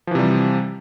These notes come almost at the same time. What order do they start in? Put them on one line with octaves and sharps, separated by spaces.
F3 E3 C3 G3